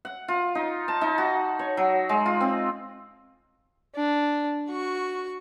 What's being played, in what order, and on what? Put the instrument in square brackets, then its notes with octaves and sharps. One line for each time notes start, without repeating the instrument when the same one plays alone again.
[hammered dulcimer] F#5
F4
D#4
A5
D#4
F#4
C#5
F#3
G#3
F4
C4
[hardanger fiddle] D4
F#4 C#6